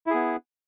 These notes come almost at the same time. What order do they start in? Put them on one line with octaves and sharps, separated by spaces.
E4 G#4 B3